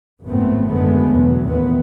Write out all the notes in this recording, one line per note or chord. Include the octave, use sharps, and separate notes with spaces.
G#1 F#2 A2 A3 B3 C4
F#2 D3 G#3 A3 B3
B1 E2 F#3
A1 D#2 D#3 B3